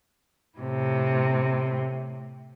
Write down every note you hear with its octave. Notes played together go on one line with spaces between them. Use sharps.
A2 C3